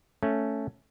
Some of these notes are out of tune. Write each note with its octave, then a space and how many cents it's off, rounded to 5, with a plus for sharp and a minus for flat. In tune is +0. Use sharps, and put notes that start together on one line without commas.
A3 +5 C#4 +0